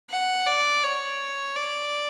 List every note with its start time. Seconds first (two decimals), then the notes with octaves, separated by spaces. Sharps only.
0.10 F#5
0.46 D5
0.83 C#5
1.56 D5